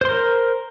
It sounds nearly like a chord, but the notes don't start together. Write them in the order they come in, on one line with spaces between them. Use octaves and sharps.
C5 C6 A#4